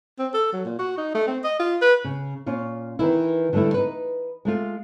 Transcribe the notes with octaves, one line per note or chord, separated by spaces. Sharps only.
C4
A4
F#3
A#2
F#4
D#4
A3
C4
D#5
F4
B4
C#3
A#2 C#4 F4
D#3 E3 E4
D3 F#3 G3 A3 E4
D#4 B4
G#3 A3 F4